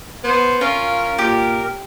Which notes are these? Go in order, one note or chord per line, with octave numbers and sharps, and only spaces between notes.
B3 C5
C#4 F4 A#4
A#2 G4